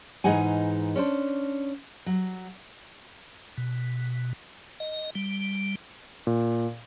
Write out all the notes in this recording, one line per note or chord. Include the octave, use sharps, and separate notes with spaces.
G#2 E3 D#4 G#4 F#5 G#5
C#4 D4 C5
F#3
B2
D#5
G3
A#2